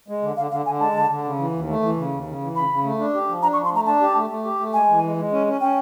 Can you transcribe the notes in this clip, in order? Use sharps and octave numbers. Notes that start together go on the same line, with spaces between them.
G#3
D3
D3 F5
D3 F5
D3 G#5
G#3 A5
D3
D3
C#3
E3
D#2
A3
E3
C#3
D#2
C#3
E3
C#3 B5
C#3
A3
D4
G4
F3
D4 A#5
C#6
F3
C6
A3 A#5
D4 A5
G4
A3
A3
G4
A3
G#3 G#5
E3
G#3
G#3
C#4
C#4
C#4 G5